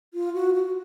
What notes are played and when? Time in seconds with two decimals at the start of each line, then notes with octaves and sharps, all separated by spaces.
0.14 F4
0.34 F#4
0.54 F#4